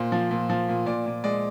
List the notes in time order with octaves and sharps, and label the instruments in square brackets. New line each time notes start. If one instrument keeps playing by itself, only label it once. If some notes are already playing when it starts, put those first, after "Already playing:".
Already playing: [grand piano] A#2 C5
F3
A#2
F3
A#2
A#2 D5
A#2
G#3 D5